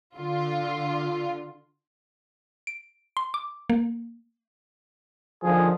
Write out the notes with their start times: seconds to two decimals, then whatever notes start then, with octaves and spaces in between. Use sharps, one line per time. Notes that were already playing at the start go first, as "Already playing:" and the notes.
0.18 D3 F4
2.67 D7
3.17 C6
3.34 D6
3.70 A#3
5.43 D3 D#3 F3 G#4